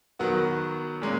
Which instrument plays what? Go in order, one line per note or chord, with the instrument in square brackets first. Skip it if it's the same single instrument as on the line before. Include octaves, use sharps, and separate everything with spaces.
[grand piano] D#3 F#3 B3 F#4
A#2 G#3 C#4